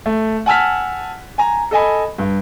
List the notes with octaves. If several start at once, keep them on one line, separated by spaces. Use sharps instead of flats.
A3
F#5 G#5 A5 E6 F6 B6
G#5 A#5
A4 D#5 G#5 B5
G2